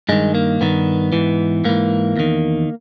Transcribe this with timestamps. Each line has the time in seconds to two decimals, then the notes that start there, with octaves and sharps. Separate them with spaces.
0.09 G2 D#3 G#3
0.35 A#3
0.61 G2 D#3 B3
1.12 G#2 E3
1.64 G#2 E3 A#3
2.17 E2 D#3